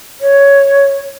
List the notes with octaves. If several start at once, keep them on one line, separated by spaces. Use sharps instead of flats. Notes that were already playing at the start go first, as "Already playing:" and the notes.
C#5